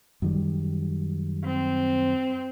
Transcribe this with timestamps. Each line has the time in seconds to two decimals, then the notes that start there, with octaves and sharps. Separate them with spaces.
0.22 F#2 D#3 G3
1.45 C4